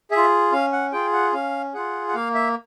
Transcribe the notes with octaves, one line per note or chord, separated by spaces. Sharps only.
G#4 E5
F4
C#4 F5
F#5
F4 G#4 G5
F#5
C#4 F5
F4 G#4 F#5
F#5
A#3 F5
E5